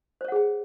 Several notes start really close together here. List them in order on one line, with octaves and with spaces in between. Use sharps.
C5 C#5 F#5 G#4 G5